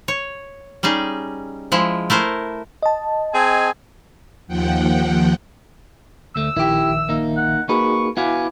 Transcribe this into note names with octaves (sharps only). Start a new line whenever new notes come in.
C#5
G3 C#4 D#4 G#4
F3 G#3 E4
A3 E4 A#4 C5
D#5 A5
C4 G#4 G#5
D#2 F3 F#5 G5
D2 A3 E6
A#1 D#3 E4 G4 E5
A#3 D#4
F#5
A#3 D#4 F#4 G#4 B4 C#6
B3 E4 F#4 F5 G#5 B5 D6